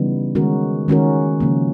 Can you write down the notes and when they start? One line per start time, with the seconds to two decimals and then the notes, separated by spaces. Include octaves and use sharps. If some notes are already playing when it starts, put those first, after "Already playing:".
Already playing: C#3 E3 G3 B3 D#4
0.35 D#3 G#3 C#4 F#4 A#4
0.88 D#3 G#3 C#4 F#4 A#4
1.40 C#3 F3 A#3